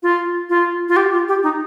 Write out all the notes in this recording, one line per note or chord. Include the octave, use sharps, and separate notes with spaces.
F4
F4
F4
G4
F4
G4
D#4